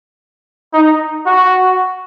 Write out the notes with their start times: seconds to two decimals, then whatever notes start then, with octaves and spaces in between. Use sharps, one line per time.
0.73 D#4
1.26 F#4